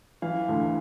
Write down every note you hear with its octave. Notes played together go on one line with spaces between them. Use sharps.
E3 F5
D2